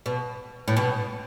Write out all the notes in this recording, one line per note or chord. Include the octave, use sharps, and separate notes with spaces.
B2
A2
B2